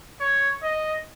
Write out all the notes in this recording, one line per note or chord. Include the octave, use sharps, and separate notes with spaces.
C#5
D#5